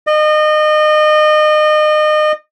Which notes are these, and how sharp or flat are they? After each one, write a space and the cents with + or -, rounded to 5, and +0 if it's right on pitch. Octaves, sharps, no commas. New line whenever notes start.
D#5 -30